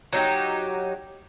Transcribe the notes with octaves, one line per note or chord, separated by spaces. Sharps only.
F#3 D#4 F#4 G4